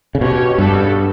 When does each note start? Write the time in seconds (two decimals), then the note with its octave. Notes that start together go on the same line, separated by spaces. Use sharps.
0.15 C#3
0.21 B2 C#4 G4 C#5
0.58 G2 G3 B3 F#4 A4